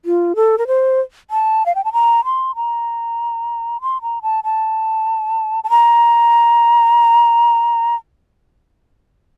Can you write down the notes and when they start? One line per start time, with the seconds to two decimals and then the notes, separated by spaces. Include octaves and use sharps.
0.05 F4
0.36 A4
0.58 A#4
0.67 C5
1.31 A5
1.66 F5
1.75 G5
1.85 A5
1.93 A#5
2.25 C6
2.56 A#5
3.81 C6
4.02 A#5
4.22 A5
4.44 A5
5.64 A5
5.70 A#5